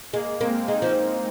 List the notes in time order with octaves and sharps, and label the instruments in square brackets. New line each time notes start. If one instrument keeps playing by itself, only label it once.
[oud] G#3 [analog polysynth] A#3
[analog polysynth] G#3 C4 [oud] A#3
[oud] G#3 [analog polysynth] A#3 D#4
[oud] F3